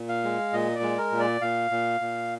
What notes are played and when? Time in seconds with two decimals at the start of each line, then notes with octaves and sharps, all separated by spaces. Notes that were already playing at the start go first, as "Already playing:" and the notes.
Already playing: A#2
0.09 F5
0.24 G#3
0.53 A#2 D#5
0.75 D5
0.82 G#3
0.98 A#4
1.12 A#2
1.20 D5
1.41 A#2 F5
1.71 A#2
2.01 A#2